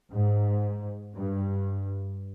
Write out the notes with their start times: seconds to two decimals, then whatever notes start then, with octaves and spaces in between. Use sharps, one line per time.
0.11 G#2
1.15 G2